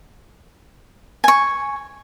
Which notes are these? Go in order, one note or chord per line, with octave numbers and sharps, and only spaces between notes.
G#5 C#6